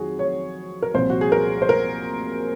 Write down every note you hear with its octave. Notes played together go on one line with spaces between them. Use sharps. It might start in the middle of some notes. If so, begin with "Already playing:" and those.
Already playing: F2 D#3 F#3 F#4 G#4
C#5
A#4
C2 A#2 F3 C5
F#4
G#4
A#4
C5
A#4